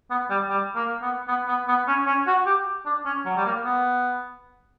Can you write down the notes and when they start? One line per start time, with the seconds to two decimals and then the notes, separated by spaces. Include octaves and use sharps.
0.10 B3
0.30 G3
0.49 G3
0.75 A#3
1.02 B3
1.28 B3
1.48 B3
1.68 B3
1.88 C#4
2.07 C#4
2.27 F#4
2.46 G4
2.86 D4
3.06 C#4
3.26 F#3
3.37 G3
3.45 A#3
3.65 B3